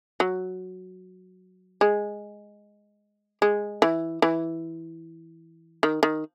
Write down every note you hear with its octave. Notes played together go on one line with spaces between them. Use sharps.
F#3
G#3
G#3
E3
E3
D#3
D#3